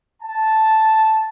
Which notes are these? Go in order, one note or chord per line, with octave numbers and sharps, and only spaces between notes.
A5